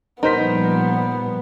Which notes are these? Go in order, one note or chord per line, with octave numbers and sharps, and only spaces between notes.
A#2 F3 G3 B3 D#4 A#4 C5 B6